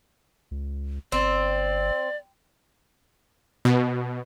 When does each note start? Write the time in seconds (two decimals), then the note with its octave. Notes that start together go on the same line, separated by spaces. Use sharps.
0.51 C#2
1.12 G1 C4 D5
3.65 B2